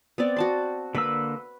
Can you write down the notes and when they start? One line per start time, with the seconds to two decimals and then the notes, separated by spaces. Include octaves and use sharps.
0.18 B3 C4 D5
0.37 F#4 A5 C6
0.95 D3 A#3 B4 B5 E6